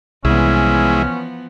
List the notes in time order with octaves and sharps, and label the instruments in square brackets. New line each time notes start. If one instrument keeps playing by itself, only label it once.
[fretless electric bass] C2 [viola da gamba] E3 F3 B3 [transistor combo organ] G#3 E4 [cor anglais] C#4